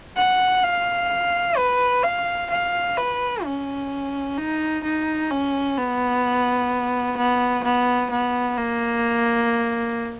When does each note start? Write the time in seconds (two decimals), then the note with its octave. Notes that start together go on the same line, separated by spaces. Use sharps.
0.16 F#5
0.64 F5
1.57 B4
2.03 F5
2.50 F5
2.97 B4
3.44 C#4
4.37 D#4
4.84 D#4
5.31 C#4
5.77 B3
7.17 B3
7.64 B3
8.10 B3
8.58 A#3